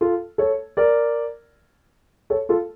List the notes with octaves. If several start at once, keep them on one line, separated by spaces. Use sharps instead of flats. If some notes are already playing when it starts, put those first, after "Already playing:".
F4 A4
A4 C#5
A#4 D5
A4 C#5
F4 A4